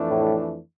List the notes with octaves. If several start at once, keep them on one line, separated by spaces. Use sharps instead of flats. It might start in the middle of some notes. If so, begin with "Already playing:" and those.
Already playing: F2 E3 A3 D4
A2